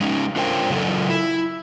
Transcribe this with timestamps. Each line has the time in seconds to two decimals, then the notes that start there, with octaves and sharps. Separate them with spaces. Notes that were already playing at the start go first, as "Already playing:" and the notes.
0.01 G#3 C#4 D#4
0.36 D4 F4 A#4 C5 G5
0.70 C#3 E3 F#3 F4 A4
1.10 E4